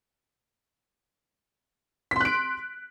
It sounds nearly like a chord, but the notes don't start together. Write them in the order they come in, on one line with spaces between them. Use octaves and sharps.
B6 C6 F#6 D7